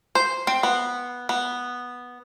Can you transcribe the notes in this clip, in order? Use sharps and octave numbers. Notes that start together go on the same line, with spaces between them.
C5
C4
B3
B3